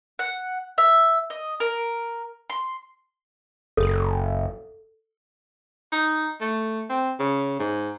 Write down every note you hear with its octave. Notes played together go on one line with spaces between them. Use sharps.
F#5
E5
D#5
A#4
C6
F#1 A4
D#4
A3
C4
C#3
G#2